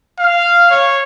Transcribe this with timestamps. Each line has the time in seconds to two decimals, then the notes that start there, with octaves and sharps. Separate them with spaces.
0.19 F5
0.70 C#5